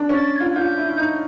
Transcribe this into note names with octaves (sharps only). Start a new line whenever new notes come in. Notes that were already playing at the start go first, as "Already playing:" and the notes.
Already playing: D4
C#4
A6
F4 G#6
G#6
F4 G6
E4
E4
D#4